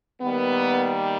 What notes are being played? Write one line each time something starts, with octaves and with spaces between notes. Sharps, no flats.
D#3 G3 A#3 B3